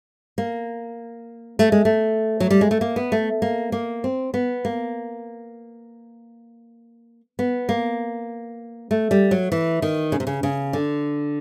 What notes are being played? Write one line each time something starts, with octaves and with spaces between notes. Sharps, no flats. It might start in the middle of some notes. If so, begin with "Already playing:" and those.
A#3
A3
G#3
A3
F#3
G3
G#3
A3
A#3
B3
A3
A#3
A#3
C4
B3
A#3
B3
A#3
A3
G3
F#3
E3
D#3
C#3
C3
C#3
C#3
D3